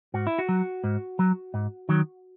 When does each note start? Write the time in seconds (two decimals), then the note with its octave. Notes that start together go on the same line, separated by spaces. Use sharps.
0.14 G#2 F#4
0.27 E4
0.39 F#4
0.49 F#3
0.84 G#2
1.19 F#3
1.54 G#2
1.89 D#3 F#3